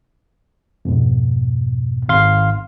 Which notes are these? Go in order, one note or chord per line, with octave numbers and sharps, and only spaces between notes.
F2 G#2 B2
G#1 F5 C6